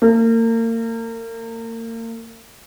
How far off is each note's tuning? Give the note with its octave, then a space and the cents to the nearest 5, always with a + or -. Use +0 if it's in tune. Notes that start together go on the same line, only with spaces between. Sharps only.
A#3 -35